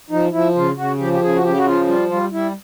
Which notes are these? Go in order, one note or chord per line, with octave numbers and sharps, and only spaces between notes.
F3 D#4
F3 E4
C#3 F4
C#3 F#4
F3 G4
G4
C#3 G#4
F#4
C#3 G4
F#4
F3 F4
G3 F4
G3 F4
G3 E4